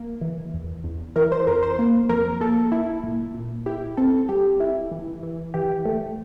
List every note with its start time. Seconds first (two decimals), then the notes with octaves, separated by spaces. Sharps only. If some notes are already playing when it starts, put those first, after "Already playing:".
Already playing: A#3
0.21 E3
0.54 E2
0.84 E2
1.16 E3 A#4
1.32 C5
1.47 F2 A#4
1.63 C5
1.79 A#3
2.09 F2 A#4
2.41 A#3 A4
2.72 E4
3.04 A#2
3.34 A#2
3.66 E4 G4
3.97 C4 A4
4.29 G3 G4
4.60 E4
4.92 E3
5.23 E3
5.54 E3 G4
5.85 A3